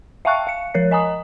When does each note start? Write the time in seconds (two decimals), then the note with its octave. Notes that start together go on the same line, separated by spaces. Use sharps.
0.25 E5 F5 G5 A5 C#6 F#6
0.47 F5 C#7
0.74 F3 A#4 C#5 C7
0.91 D#5 G#5 A#5 D#6